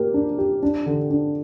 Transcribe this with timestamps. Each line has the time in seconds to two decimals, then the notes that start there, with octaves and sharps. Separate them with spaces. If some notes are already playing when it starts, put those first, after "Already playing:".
Already playing: A#3 G4
0.14 D4
0.38 G4
0.63 D4
0.86 D3
1.10 D4